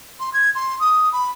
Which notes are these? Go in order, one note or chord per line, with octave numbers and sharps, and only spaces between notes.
C6
G#6
C6
D#6
B5